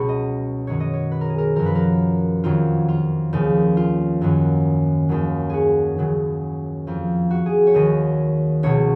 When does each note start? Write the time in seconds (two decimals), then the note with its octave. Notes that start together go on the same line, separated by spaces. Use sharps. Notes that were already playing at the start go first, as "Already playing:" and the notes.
Already playing: C#2 B2 F#3 B5 C#6
0.09 D#5
0.67 F#2 D#3 F#3 C#5
0.80 D#5
0.94 C#5
1.12 B4
1.21 A#4
1.30 G#4
1.38 A#4
1.56 F#2 F3 A#4
1.66 B4
1.75 A#4
2.44 F2 D#3 F#3 F4
2.88 F4
3.33 D#2 C#3 F3
3.77 F4
4.21 F#2 D#3 F#3
5.09 D#2 D#3 F#3
5.50 F#4 G#4
5.97 D#2 C#3 F#3
6.87 F2 F3
7.31 F#4
7.46 G#4
7.67 C#5
7.74 D#2 D#3 F#3 D#5
8.63 C#2 B2 F#3 C#5